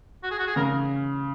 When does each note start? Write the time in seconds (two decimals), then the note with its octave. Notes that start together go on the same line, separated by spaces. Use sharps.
0.23 F#4
0.31 G#4
0.39 F#4
0.47 G#4
0.56 C#3 A#4